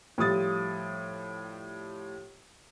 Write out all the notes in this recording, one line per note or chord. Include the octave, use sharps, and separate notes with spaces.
A2 F3 G3 D#6 A6